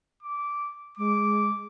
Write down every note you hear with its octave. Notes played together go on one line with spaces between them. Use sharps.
D6
G#3 D6